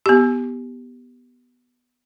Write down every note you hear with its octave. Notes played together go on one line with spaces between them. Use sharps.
B3 G4